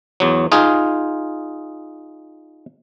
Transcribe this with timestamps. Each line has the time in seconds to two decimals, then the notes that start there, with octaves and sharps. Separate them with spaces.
0.20 E2 F#3
0.52 D#4 F4 G#4